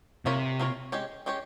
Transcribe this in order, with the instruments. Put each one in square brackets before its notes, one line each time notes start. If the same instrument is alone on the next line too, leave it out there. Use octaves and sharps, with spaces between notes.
[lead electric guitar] C3 [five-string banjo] A#3 F4 A#4 C#5
[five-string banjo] A#3 F4 A#4 C#5
G#3 C#4 G4 C#5
G#3 C#4 G4 C#5